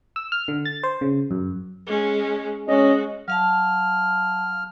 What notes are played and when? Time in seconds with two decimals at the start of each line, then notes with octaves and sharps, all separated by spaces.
0.16 E6
0.32 F6
0.48 D3
0.65 A6
0.83 C5
1.01 C#3
1.31 F#2
1.87 G#3 C#4
2.68 G#3 C#4 F#4 D#5
3.28 F#3 F5 A5 F6